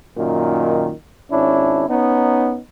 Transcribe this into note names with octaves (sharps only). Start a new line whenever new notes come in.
F#2 A#2 D#3
G#1 C#4 D4 E4
B3 C#4 D#4